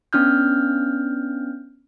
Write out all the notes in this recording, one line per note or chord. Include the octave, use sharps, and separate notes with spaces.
B3 C#4 D4 F6 G6